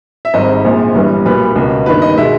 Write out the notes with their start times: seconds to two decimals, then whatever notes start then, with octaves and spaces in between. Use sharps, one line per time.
0.25 E5
0.34 G#1 G#2 G3 D#5
0.64 A#1 A#2 G#3
0.95 G1 G2 E3 G3
1.25 B1 A#2 G3 A#3 B4
1.56 C#2 B2 A#3
1.86 G1 G2 D#3 A#3 B4
2.02 D#5
2.17 B2 G#3 E5